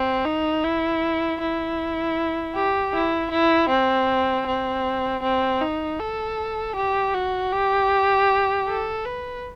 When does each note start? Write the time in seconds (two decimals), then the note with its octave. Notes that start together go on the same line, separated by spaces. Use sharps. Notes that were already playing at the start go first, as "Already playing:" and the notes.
Already playing: C4
0.25 D#4
0.64 E4
1.40 E4
2.55 G4
2.93 E4
3.31 E4
3.69 C4
4.47 C4
5.23 C4
5.61 D#4
5.99 A4
6.76 G4
7.14 F#4
7.53 G4
8.68 A4
9.05 B4